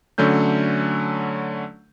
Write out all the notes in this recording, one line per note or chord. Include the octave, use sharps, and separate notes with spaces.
D3 F#3 A3 C#4 G6